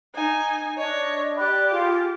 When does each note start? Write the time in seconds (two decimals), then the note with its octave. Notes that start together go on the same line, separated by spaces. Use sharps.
0.15 D#4 G#5
0.77 D4 C#5 D#5
1.38 G4 D5 B5 F#6
1.71 F4 G#4 F5